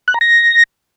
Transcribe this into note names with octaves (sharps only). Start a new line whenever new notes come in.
F#6
A#5
A#6